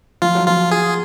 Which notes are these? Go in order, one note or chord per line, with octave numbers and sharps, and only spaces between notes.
F3 F4
F#3
F3 F4
G#4